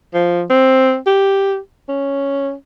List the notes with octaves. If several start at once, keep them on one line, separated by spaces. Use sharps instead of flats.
F3
C4
G4
C#4